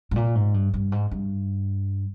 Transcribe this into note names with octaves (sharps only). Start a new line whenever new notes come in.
G#2
A#2
G#2
G2
G2
G#2
G2